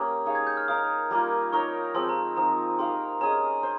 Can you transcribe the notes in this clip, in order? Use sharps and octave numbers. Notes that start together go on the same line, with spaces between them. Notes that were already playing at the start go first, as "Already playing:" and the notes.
Already playing: A#3 C#4 G4 D#6
D#4 G#4 C#5 F5
G#6
G6
F6
D#4 A#4 F5 D#6
G3 A#3 F4
D#4 A#4 C#5 C#6
F3 G#3 C4 C6
A#5
F3 C4 D#4 A#5
D#4 G4 A#4 F5 C6
C#4 G#4 D#5 A#5
C5